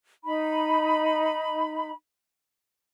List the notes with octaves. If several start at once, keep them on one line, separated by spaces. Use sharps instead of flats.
D#4 B5